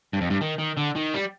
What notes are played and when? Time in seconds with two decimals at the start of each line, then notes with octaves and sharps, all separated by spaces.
0.13 G2
0.21 F2
0.30 G2
0.41 D#3
0.59 D#3
0.77 D3
0.96 D#3
1.14 G3